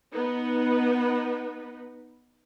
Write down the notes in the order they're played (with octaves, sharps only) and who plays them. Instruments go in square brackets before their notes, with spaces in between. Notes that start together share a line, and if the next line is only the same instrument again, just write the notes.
[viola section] B3 D#4 B4